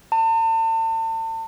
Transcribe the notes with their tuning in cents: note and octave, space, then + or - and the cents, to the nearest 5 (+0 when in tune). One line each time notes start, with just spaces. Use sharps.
A5 +40